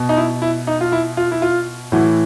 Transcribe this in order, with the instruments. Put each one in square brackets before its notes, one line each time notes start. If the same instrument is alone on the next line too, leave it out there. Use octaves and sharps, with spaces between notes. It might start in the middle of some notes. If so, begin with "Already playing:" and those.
Already playing: [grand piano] B2
D#4
E4
E4
D#4
F4
E4
F4
E4
F4
A2 E3 F#4